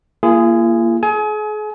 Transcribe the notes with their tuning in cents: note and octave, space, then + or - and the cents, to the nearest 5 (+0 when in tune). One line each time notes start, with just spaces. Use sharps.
A#3 +0 F4 -45 G#4 +0
G#4 +40 G#5 +30